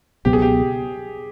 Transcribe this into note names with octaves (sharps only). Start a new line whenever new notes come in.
C#2 B2 F#3 B3 G4
G#4
G4